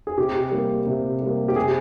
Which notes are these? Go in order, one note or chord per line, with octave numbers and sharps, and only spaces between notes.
G#4
C3 G4
G3 A#3
C3
G3 A#3
G4
C3 G#4